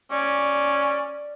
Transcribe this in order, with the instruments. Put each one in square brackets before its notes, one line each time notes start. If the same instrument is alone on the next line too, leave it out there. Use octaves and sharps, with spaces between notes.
[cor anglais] C#4 [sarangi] D5